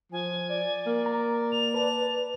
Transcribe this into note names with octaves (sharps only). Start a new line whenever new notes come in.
F3 G#5
D5
A#3
A#5
F7
B4 D5 A5